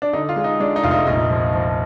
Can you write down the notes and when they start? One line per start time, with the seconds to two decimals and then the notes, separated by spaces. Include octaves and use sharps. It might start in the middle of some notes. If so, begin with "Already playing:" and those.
0.02 D4
0.13 D3 D#4
0.29 F4
0.36 G#3
0.44 D#4
0.60 G#3 D4
0.76 D#4
0.83 F1 F4
0.91 D#4
1.07 A#1 D#4
1.30 F3
1.54 F3